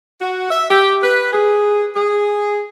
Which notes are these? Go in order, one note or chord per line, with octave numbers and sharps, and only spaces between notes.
F#4
E5
G4
B4
G#4
G#4